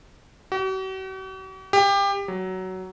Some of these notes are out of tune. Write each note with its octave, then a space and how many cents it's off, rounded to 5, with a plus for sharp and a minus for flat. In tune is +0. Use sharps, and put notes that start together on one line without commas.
F#4 +45
G4 +25
F#3 +15